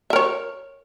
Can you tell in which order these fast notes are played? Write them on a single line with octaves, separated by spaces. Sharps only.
E5 A#4 C#5